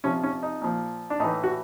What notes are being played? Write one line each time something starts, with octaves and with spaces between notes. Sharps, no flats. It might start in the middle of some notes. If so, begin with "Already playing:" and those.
C3 F3 C#4
C#4
D#4
A#2 F3
D4
A2 E3 D#4
F#4